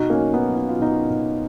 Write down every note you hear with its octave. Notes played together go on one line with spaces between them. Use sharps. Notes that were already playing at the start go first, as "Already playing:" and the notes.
Already playing: B2 D#4 F#4
A#3 C#4
F#3
B3 D#4
F#3
D#4
F4
B2 B3 D#4
B2